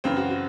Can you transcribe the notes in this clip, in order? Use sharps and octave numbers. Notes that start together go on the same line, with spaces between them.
F#2 C#3 E3 C4
F#4
F#4